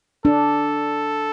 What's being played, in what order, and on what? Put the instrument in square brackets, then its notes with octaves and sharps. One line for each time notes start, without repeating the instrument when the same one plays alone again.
[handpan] D4 [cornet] A4